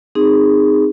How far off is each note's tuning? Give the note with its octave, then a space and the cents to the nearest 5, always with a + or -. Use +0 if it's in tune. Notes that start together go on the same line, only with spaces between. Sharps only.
C4 +0 D#4 +0 G#4 -20